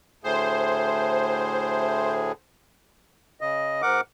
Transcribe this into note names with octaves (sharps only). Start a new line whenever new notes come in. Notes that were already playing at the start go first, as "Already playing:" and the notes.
D2 A2 G#4 C5
C#3 D#5
G#2 A#4 F#5 D6